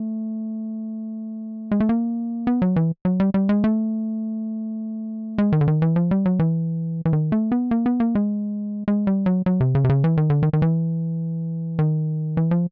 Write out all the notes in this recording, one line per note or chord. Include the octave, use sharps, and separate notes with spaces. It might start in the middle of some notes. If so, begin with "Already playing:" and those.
Already playing: A3
G#3
A3
A#3
B3
F#3
E3
F#3
G3
G3
G#3
A3
G#3
D#3
D3
D#3
E3
F3
G3
F#3
E3
E3
D#3
A3
B3
A#3
B3
A#3
G#3
G#3
G3
F#3
F#3
C3
C#3
C3
C#3
E3
D#3
D3
D#3
D#3
E3
D#3
E3
F3